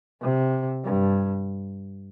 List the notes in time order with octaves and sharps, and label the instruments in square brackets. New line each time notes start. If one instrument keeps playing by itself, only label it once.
[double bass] C3
G2